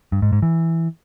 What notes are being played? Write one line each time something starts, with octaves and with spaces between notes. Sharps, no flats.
G2
G#2
G#2
E3